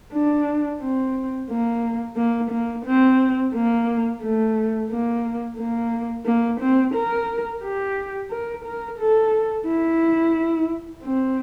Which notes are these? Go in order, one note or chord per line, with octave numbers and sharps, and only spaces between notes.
D4
C4
A#3
A#3
A#3
C4
A#3
A3
A#3
A#3
A#3
C4
A#4
G4
A#4
A#4
A4
E4
C4